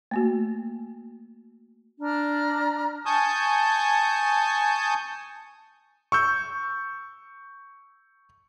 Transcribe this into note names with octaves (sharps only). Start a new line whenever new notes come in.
A3 A#3 F#4
D4 A#5 F6
G#5 A5 C#6 D#6 G6
C#6 E6 G6